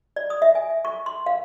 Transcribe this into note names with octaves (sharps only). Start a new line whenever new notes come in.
D5
D#6
E5
G#5
E5
C#6
C6
F5